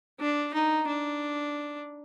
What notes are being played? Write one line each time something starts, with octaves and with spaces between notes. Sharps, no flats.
D4
D#4
D4